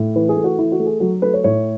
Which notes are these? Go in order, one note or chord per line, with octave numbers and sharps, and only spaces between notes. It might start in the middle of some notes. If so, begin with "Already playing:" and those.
Already playing: A2
E3 B4
G#4
A3
F#4
E3 E4
F#4
A3
G#4
F#3 F#4
A3 B4
C#5
A2 C#5